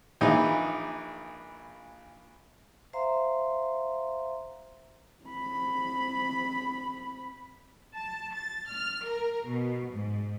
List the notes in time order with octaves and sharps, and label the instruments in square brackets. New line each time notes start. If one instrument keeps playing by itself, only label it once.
[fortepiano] A#1 E3 D#4
[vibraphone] C5 E5 F5 A#5 C6
[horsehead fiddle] C4 B5
[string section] A5
A6
F6
A#4
B2
G#2